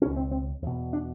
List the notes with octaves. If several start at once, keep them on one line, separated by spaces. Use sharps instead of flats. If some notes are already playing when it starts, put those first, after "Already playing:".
C#2 B2 C#4
C4
C4
E2 B2
D4